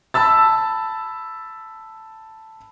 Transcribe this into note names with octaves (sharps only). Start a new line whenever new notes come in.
A5 B5 E6 A6